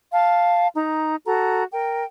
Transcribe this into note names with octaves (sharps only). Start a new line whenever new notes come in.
F5 A5
D#4 A#5
F#4 A4 A#5
A#4 G5